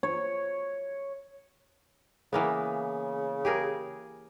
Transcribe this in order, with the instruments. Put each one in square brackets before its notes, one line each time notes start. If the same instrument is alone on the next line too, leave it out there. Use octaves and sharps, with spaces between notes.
[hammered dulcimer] C#5
[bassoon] C#3 [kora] E3 A#3 B3
[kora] G4 G#4 A#4